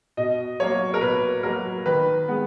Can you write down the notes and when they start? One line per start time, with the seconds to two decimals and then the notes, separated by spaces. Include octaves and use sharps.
0.17 B2 D#5
0.60 F#3 A#3 C#5
0.94 A#4
1.01 B2 B4
1.43 F#3 A#3 A#4
1.86 D#3 B4
2.28 G#3 B3